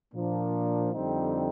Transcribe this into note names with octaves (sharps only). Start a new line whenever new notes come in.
A#2 F3 A#3 D4
F2 D3 G3 C4 D#4